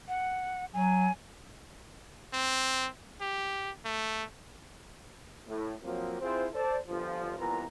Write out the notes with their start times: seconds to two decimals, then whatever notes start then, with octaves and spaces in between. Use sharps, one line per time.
0.08 F#5
0.74 F#3 G#5
2.33 C4
3.21 G4
3.85 A3
5.47 A2
5.83 F3 F#3 A#3 C4
6.21 C4 E4 F4 G#4 C5
6.54 A4 C5 D5 A5
6.88 G1 F3
7.38 C2 A#2 E3 B3 F4 A#5